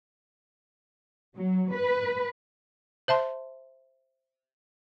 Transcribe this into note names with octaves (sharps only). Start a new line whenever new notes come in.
F#3
B4
C5 E5 A5 C6